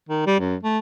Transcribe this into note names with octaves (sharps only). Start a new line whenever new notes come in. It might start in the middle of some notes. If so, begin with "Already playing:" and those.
D#3
G3
F#2
A3